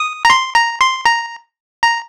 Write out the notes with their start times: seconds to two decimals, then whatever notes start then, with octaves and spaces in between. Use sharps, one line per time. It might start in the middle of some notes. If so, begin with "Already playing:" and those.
Already playing: D#6
0.25 A#5
0.30 C6
0.55 A#5
0.81 C6
1.06 A#5
1.82 A#5